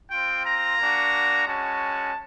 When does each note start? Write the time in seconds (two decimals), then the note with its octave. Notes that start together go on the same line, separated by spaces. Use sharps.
0.11 C4 F4 G5
0.45 A#5
0.77 A#3 D4 F#4
1.45 G#3 C#4 F#4 A5